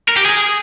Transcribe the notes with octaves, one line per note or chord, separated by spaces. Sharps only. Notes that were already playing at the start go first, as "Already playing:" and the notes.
A#4
G4
G#4